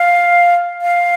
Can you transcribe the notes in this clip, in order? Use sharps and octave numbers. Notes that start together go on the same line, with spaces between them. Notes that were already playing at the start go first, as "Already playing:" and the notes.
Already playing: F5
F5